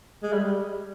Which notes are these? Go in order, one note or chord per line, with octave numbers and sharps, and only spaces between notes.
G#3
G3